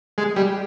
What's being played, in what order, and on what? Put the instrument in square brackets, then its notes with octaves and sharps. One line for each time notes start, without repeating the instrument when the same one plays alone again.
[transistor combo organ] G#3
G3